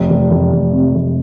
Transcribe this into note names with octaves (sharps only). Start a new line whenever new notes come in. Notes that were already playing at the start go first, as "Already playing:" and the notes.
Already playing: F1
F1
F1
F1
C3
F1